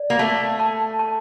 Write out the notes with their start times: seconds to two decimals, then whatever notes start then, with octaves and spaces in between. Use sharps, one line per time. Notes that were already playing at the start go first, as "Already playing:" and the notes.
Already playing: D5
0.10 A#3
0.19 A3 A5
0.60 A5
0.99 A5